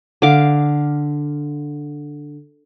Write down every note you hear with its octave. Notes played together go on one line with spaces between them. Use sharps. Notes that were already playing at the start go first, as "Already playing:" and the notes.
D3 F5 D6